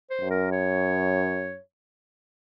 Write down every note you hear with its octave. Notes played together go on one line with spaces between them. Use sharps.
C5
F#2
A#4
C#5